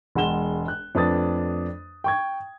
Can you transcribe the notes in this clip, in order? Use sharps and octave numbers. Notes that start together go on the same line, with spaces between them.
E1 G#3 F#5 C6 E7 G7
F#6
F2 A3 D4 B4 D#6 A6
G5 C#6 G#6